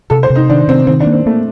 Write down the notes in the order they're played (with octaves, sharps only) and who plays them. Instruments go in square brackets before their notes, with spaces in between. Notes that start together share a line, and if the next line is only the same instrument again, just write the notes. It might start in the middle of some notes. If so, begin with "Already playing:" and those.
[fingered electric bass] C3 [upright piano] A4
[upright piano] C5
[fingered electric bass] C3
[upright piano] D#4
[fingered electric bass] D#3 [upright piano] D4
[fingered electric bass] C3 [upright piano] C4
[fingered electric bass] D#3 [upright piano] C4
[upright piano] D4
[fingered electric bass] A#3
[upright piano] C4
[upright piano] A3 [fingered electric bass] A#3